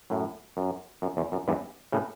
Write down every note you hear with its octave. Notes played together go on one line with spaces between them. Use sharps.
F#2 A2
F#2
F#2
E2
F#2
E2 G2
A2 C#3